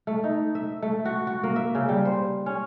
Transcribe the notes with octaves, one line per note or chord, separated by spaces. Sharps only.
A3
D#4
E5
A3
F#4
F#4
A#3
E5
C#3
G3
C5
C#4